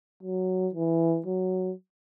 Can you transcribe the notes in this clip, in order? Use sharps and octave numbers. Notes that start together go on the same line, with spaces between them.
F#3
E3
F#3